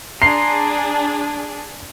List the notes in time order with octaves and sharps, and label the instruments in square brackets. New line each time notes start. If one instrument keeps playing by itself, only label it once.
[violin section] D4 G#4 [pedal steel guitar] A#5 C6 [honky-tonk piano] C7